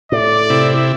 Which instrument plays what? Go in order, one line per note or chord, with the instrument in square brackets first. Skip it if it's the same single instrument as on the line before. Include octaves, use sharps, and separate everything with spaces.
[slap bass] A2 [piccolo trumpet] D5
[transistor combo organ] C3 E4